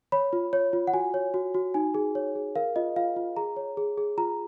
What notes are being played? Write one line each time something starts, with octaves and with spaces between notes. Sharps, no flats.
C#5 B5
F4
C#5
F4
F#5
F#4 G#5
C#5
F#4
F#4
D#4 G#5
G#4
C#5
G#4
A#4 F5
F4 D#5
F4 F5
F4
G#4 A#5
C#5
G#4
G#4
F4 A#5